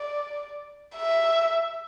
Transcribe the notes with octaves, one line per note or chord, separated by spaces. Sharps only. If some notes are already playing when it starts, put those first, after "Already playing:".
Already playing: D5
E5